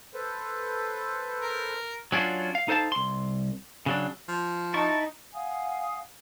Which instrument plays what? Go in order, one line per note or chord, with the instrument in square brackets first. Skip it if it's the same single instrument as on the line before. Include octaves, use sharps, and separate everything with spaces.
[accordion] A4 B4 C5
[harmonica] A#4
[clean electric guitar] F#3 C#4 D4 F4 F#4
F5
D#4 A4 C5 F5 A5
C2 C6
C#3 F#3 D4
[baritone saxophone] F3
[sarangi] D#4 [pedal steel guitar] E4 A5 C#6
[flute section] F5 F#5 G#5 D#6